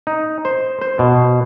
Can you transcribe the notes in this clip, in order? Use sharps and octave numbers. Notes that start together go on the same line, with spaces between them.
D#4
C5
C5
B2